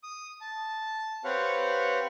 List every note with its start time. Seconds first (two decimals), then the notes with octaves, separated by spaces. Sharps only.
0.03 D#6
0.41 A5
1.24 C4 G4 B4 C#5 F5 F#5